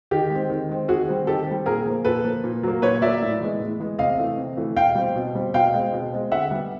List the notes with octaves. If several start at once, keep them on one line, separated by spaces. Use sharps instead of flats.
D#3 G4
G#3 C4
D#3
G#3 C4
D#3 F#4 G#4
G3 C4
D#3 G4 A4
G3 C4
A#2 G#4 A#4
F3 A#3
A#2 A4 B4
F3 A#3
A#2
F#3 A#3
A#2 B4 C#5
F#3 A#3 D5 E5
A2
E3 G#3 B3
A2
E3 G#3 B3
C3 D#5 F5
E3 A3
C3
E3 A3
B2 F5 G5
G3 C4
B2
G3 C4
B2 F5 G5
G#3 C4
B2
G#3 C4
D3 E5 F#5
G3 B3